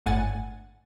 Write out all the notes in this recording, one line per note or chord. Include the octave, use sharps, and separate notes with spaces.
G1 A2 F#5 G#5 A6